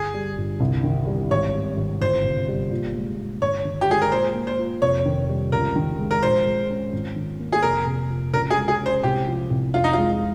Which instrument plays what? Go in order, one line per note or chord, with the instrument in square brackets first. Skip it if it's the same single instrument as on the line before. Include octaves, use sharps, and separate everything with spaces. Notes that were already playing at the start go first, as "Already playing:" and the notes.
Already playing: [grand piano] G1 [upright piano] G#4
[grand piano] G3
G1
C2
D#3
G3
[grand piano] G#1 [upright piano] C#5
[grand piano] G3
G#1
[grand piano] G1 [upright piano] C5
[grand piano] C3
G3
A#2
G#3
A#2
[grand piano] G1 [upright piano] C#5
[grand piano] D#3
[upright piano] G4
[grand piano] G#3 [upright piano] G#4
[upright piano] A#4
[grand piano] A#2 [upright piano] C5
[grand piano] A#3
[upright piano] C5
[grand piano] F4
[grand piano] F1 [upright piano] C#5
[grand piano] D#3
G3
[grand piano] C#2 [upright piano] A#4
[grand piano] D#3
G#3
[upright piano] A#4
[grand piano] A#1 [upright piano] C5
[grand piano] G#3
C#4
G#1
D#3
A#3
[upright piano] G#4
[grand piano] F1 [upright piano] A#4
[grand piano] C3
F3
[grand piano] C#2 [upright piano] A#4
[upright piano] G#4
[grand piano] G#3
[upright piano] G#4
[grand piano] C#4
[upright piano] C5
[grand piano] C2 [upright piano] G4
[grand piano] F3
C2
[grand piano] F2 [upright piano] F4
[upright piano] D#4
[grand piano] G#3 [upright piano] F4